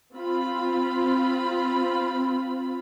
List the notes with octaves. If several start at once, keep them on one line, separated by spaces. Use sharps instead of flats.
C4 F4 B5